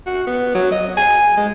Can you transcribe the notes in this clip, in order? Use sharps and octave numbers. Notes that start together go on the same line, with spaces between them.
F#4
B3
F#3
D#5
G#5
G#3